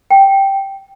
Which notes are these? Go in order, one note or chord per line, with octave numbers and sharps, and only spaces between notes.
G5